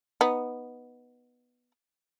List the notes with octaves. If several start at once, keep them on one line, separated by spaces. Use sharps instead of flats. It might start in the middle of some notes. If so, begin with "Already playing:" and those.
B3 D#4